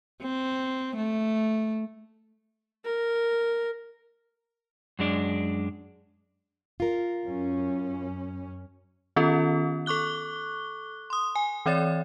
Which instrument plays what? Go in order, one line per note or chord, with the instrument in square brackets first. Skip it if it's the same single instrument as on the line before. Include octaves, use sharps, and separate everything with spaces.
[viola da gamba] C4
A3
[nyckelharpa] A#4
[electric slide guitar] F#2 G#3 D4
[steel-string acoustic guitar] F4 A#4
[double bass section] F#2 C#4
[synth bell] D#3 B3 C#4 F4 A4
A4 C#6 D6 F#6 G7
C6 D#6
G#5
E3 C4 C#5 D5 A6